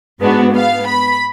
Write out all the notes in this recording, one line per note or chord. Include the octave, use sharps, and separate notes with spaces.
G#2 G#3 B3 D4 F#4
B3 F5
B5